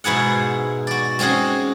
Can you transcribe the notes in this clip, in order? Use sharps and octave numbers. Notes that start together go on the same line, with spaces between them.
G#2 B2 E4 G#4 F#5
F#4 D5
G#3 C4 C#4 F#4 G#4